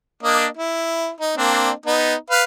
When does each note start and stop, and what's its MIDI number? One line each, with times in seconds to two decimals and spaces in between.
0.23 0.46 58
0.23 0.46 62
0.23 0.46 75
0.57 1.10 64
1.21 1.33 63
1.37 1.71 58
1.37 1.71 60
1.37 1.71 62
1.86 2.15 59
1.86 2.15 63
2.30 2.43 71
2.30 2.43 77